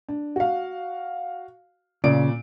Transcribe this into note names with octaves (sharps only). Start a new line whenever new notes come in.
D4
F#4 F5
A#2 C#3 D5 D7